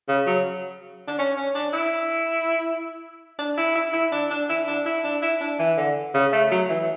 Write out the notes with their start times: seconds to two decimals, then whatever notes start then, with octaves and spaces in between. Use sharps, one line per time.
0.08 C#3
0.27 F#3
1.08 D4
1.19 C#4
1.37 C#4
1.55 D4
1.73 E4
3.39 D4
3.58 E4
3.75 E4
3.93 E4
4.12 D4
4.31 D4
4.49 E4
4.67 D4
4.86 E4
5.04 D4
5.22 E4
5.41 D4
5.59 E3
5.77 D3
6.15 C#3
6.33 A3
6.51 F#3
6.70 E3